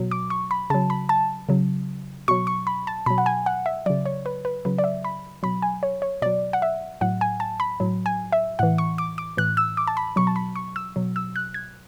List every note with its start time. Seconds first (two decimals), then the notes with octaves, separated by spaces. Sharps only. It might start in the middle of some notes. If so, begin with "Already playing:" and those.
Already playing: B2 F#3
0.11 D6
0.30 C#6
0.51 B5
0.70 C#3 F#3 A5
0.90 B5
1.09 A5
1.49 C#3 F#3
2.28 B2 F#3 C#6
2.47 C#6
2.67 B5
2.87 A5
3.06 B2 F#3 B5
3.18 F#5
3.26 G#5
3.46 F#5
3.66 E5
3.86 C#3 F#3 D5
4.05 C#5
4.26 B4
4.45 B4
4.65 C#3 F#3 B4
4.78 D5
4.84 E5
5.04 B5
5.43 B2 F#3 B5
5.62 G#5
5.83 C#5
6.02 C#5
6.22 B2 F#3 D5
6.53 F#5
6.62 E5
7.01 A2 F#3 F#5
7.21 G#5
7.40 A5
7.60 B5
7.80 A2 F#3
8.06 G#5
8.32 E5
8.59 A2 E3 F#5
8.78 C#6
8.98 D6
9.18 D6
9.37 A2 E3 F#6
9.57 E6
9.77 D6
9.87 A5
9.97 B5
10.16 B2 F#3 C#6
10.27 A5
10.36 B5
10.56 C#6
10.76 E6
10.96 B2 F#3
11.16 E6
11.36 F#6
11.54 G#6